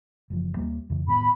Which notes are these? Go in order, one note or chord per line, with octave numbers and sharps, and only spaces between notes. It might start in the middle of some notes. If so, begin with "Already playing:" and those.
F#1 E3 F3
D#2 G3 A#3
F2 C#3 E3
A2 D#3 B3 B5